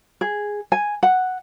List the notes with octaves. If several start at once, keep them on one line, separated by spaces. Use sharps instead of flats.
G#4
G#5
F#5